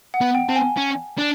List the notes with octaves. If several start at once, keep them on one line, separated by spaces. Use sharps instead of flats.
F#5
B3
G5
C4 A5
G#5
C#4
D4